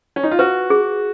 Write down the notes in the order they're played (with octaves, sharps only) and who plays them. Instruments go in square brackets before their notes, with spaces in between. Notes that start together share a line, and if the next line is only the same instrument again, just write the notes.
[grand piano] C#4
D#4
F4
[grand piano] F#4 [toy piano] B4
[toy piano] G#4